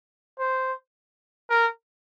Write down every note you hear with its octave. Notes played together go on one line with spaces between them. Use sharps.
C5
A#4